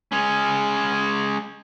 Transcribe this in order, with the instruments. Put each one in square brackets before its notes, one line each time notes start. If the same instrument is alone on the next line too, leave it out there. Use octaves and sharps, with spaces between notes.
[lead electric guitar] G#3 C#4